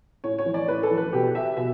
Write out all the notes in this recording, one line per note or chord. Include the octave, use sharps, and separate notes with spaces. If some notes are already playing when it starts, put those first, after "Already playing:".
A2 C#5
C#5
E3
D5
A2 B4
A4
E3
B4
B2 G4
E5
B2 E5